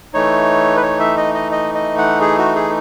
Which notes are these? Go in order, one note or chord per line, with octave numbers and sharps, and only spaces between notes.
E3 A3 D#4 C#5
B4
C#5
E5
D#5
D#5
D#5
D#5
F#5
G#4
F#4
G#4